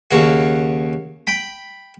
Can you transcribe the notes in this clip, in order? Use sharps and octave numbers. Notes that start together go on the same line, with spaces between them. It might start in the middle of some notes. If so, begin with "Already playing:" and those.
D#2 C#3 F#4
G5 B5